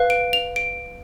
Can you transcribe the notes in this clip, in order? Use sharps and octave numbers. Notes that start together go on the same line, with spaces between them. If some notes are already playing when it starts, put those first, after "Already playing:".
Already playing: B4 F5
D7
F7
D7